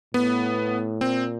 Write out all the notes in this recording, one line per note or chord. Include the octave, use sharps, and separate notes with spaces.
A2 B3
A#2 C4